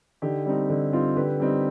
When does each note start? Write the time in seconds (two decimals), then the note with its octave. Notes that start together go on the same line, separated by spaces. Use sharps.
0.22 D3 D#4 G4
0.46 G3 C4 D#4
0.69 D3 D#4
0.93 G3 C4 D#4 F4
1.16 D3 G4 B4
1.40 G3 C4 D#4